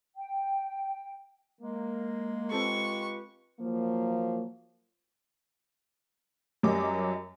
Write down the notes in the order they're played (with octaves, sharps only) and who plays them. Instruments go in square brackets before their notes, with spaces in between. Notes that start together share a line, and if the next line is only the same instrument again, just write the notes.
[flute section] G5
[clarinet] G#3 [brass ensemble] A#3
[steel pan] C4 A4 [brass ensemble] F4 G4 B4 [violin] C#6
[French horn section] F3 F#3 A#3
[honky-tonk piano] F#2 F#3 G3 A#4 D#5 D6